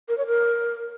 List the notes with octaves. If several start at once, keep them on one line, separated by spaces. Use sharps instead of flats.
A#4
C#5
A#4